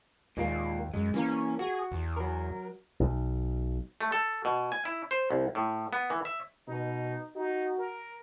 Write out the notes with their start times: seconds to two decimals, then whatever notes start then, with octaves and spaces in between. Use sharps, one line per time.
0.37 D#2 A#2 G#3 A#3
0.94 F#2 G#3
1.14 E3 A#3 C#4 A#4
1.59 F#4 G#4
1.91 E2
2.17 F#3 A#4
3.00 B1
4.01 A3
4.12 A4
4.45 B2
4.72 G#5
4.85 E4
5.11 C5
5.31 C2
5.55 A2
5.93 B3
6.10 E3
6.25 E5
6.68 B2 D#4
7.36 D#4 F#4
7.79 A#4